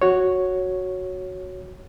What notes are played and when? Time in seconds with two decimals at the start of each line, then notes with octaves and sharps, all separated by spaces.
0.02 F#4 C#5